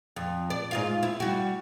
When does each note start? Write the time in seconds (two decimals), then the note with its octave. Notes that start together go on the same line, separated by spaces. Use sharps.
0.16 F2
0.50 D5
0.71 G#2 F4 F5
1.03 E4
1.20 G3 F#4